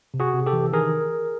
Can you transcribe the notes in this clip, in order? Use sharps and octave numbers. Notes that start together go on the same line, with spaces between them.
C3
F#4 G#4
C3
G4 A4
E3
D#3 G#4 A#4